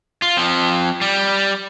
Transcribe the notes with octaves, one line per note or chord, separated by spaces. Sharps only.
F4
F3 C4
G3